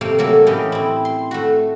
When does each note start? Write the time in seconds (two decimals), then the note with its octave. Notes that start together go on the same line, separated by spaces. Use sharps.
0.01 C3 A3 A#3 F5
0.19 F#3 A3 A#3 A4
0.46 A2 E3 C#4 G4 D#5
0.72 C4 E4
1.05 C6
1.31 A3 F#4